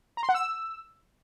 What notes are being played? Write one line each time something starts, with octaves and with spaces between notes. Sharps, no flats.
A#5
C6
F#5
E6